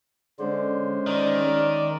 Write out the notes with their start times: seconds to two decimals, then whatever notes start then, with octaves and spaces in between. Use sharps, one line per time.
0.39 D3 G#3 C#4 C5
1.07 D#3 D5